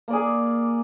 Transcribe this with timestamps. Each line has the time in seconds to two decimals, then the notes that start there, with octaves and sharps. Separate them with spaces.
0.08 A#3
0.10 D5
0.13 G#4